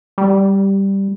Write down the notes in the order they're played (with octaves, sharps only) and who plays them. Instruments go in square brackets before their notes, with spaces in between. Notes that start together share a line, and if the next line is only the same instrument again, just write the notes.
[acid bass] G3